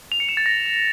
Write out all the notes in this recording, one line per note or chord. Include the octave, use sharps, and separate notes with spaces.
F7
C#7
E7
A6
A#6